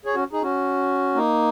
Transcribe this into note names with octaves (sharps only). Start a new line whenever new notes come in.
G#4 C#5
C#4 F#4
D#4 G#4
C#4 F#4
A#3 D#4